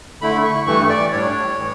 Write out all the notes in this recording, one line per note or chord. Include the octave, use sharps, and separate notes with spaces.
D3 A3 E4 B5
C#6
G2 E3 A3 C#6
D5
A2 G3 D4 C#5
A2 E3